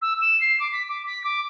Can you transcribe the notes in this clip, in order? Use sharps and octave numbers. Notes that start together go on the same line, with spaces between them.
E6
E7
C7
D6
B6
D6
B6
D6